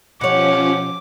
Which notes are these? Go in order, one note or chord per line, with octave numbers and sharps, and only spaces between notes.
B2 F3 C#4 G4 C#5 F#5 D6